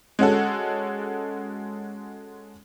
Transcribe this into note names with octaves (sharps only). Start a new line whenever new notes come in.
G#3 C#4 F#4 A4